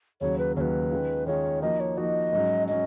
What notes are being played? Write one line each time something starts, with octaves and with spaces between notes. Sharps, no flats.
D#2 C#3 F#3 C#5
B4
D#2 C#3 F#3 B4 C#5
D#3 G#3 C#4 F4
D#3 G#3 C#4 F4 C#5
F3 A#3 D#4 F#4 D#5
C#5
F3 A#3 D#4 F#4 D#5
G#2 F#3 C#4
F#3 C#4 D#5